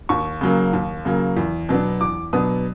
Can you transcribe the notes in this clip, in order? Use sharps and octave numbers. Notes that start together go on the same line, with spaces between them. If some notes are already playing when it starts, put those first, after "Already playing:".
D#2 C#6
C#3 F#3 A#3
D#2
C#3 F#3 A#3
E2
B2 F#3 B3 D4
E2 D6
B2 F#3 B3 D4 D#6